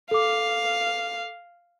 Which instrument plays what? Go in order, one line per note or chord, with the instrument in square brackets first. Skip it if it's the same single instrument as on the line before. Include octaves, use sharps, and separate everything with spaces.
[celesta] A4 D6 [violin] F5